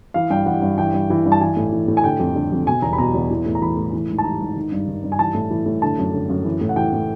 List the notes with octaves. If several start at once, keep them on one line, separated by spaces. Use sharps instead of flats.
E3 F5
G2 G5
E3 F#5
G2
E3 G5
G2
E3
G2
A5
E3 G#5
A2
E3
A2
G#5
D3 G5
F2
D3
F2
B2 G#5
E2 A#5
B5
B2 A#5
E2
E3
A2
A#5
E3 B5
A2
E3
G#2
A5
E3 A#5
G#2
D#3
G2
D#3
G2
G#5
E3 A5
A2
E3
A2
D3 A5
F#2
D3
F#2
E3
A2
F#5
E3 G5
A2